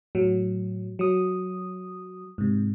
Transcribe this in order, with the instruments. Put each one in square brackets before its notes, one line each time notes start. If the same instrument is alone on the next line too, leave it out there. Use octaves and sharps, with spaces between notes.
[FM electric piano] A2 F#3
F#3 D#6
G#2 C3